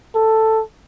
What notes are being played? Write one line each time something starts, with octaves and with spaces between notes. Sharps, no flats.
A4